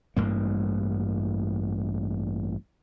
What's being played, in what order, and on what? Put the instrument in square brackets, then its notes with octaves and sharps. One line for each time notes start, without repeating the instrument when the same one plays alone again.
[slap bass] A1 G2 A#3